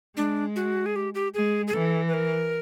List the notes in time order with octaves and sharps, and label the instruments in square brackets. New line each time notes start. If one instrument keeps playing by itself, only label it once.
[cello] G#3 [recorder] D4
[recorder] F#4
G#4
G4
G4
[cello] G#3 [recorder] G#4
[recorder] G#4
[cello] E3 [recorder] A4
[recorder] B4
A#4